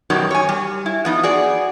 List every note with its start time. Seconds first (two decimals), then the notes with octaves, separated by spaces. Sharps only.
0.10 F#2 B2 D#3 F#3 G3
0.31 C#5 G#5
0.49 G3
0.86 E4
1.05 F3 B3 D#4
1.23 F#4 G#4 D5